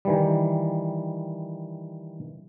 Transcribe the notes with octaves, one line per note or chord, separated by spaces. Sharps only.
D#3 E3 G3